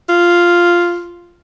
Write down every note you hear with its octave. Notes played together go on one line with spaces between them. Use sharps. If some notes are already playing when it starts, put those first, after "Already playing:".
F4